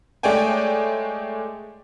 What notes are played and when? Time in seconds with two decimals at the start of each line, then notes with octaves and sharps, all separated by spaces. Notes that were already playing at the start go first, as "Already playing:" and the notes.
0.23 G#3 A3 C#5 D5 G5 G#5